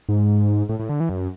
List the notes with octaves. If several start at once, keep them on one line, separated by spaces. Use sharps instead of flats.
G#2
A2
A2
D3
E3
F#2